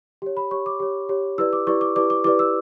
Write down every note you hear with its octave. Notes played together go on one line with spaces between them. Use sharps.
G4 C#5
B5
G4 C#5 C#6
D6
G4 C#5
G4 C#5
E4 G4 B4 D5 E6
D6
E4 G4 B4 D5 C#6
D6
E4 G4 B4 D5 D6
D6
E4 G4 B4 D5 D6
E6